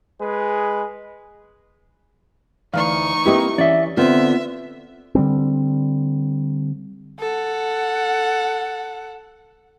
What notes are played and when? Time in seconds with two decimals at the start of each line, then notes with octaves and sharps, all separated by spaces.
0.20 G#3 G#4 B4
2.74 D2 E3 D#4 F5 C#6
3.26 A#3 C4 E4 G4 B4 D#5
3.58 E3 C#4 D5 E5
3.97 D3 B3 C4 F4 C5 E5
5.15 D3 G3 C4
7.19 A4 F#5